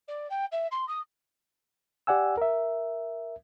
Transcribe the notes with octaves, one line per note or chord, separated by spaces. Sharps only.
D5
G5
E5
C6
D#6
G4 D5 F#5 G#5 E6
A#4 E5